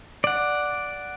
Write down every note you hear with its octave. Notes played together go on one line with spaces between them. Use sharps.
D5 F#5